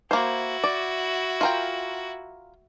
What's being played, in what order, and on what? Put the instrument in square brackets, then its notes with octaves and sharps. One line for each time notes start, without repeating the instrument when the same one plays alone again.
[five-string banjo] A#3 C5 [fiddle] E4 F#4
[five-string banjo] D5
F4 A#4 G5